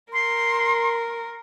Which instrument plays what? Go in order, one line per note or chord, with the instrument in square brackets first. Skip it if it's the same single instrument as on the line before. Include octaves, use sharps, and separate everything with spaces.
[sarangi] A#4 [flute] C6